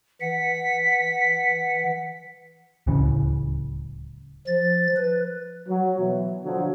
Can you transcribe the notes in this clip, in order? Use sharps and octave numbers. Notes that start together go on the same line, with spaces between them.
E3 F#5 B6
D1 C#2 C#3 E3
F3 A6
B4
F#3
B2 E3
D3 F3 F#3